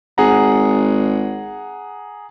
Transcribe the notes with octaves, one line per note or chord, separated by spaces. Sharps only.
G#1 G#4 F#5 A#5